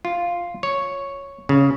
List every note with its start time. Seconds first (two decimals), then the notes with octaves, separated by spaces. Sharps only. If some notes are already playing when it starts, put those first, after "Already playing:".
0.05 F4
0.63 C#5
1.49 C#3